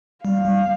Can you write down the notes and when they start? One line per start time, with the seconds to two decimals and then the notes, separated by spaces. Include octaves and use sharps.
0.25 G3 F5
0.45 G3